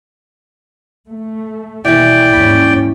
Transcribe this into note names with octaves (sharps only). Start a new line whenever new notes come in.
A3
D#2 B2 E3 G3 D5 G5
D#2 G#2 C#4 B5